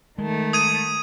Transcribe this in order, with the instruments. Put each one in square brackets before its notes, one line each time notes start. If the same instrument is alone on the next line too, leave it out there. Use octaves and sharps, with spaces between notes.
[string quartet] D#3 A3 [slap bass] G#3
[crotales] D#6 G#6 D#7